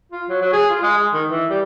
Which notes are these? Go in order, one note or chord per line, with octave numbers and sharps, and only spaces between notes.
F4
F#3
F#3
G#4
F4
G#3
G#3
D#3
E3
G3